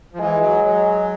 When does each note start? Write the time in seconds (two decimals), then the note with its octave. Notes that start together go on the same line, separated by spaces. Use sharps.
0.13 F3
0.19 E3 G#3
0.41 F#3
0.64 F#3